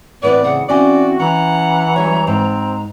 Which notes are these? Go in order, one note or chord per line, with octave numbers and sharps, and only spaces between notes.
A2 E3 B3 C4 B4 D5
C#3 F#5
E3 C4 C#4 F#4 D5 G#5
E3 C#4 F#5 A#5
F#3 G3 C#4 C#5
G#2 C4